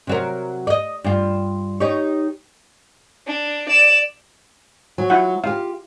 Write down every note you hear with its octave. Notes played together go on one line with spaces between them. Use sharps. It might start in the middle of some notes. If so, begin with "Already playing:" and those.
C3 F#3 A#4
D5 D#5
G2 F4
D#4 G4 C#5
D4
D5 E7
F#3
E4 F4 F#5
F4 G4 F5